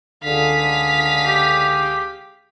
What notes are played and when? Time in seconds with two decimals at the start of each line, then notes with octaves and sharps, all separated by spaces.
0.23 C#2 D3 G#4 F5 B6
1.25 G4